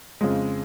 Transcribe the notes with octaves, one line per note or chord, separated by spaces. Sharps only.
F2 C#3 F3 G#3